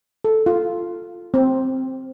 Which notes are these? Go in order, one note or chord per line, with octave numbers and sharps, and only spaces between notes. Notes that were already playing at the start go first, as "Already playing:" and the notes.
A4
F4
C4